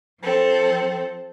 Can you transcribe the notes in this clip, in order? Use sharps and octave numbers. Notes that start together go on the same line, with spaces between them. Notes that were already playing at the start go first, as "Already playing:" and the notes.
F3 C4 A4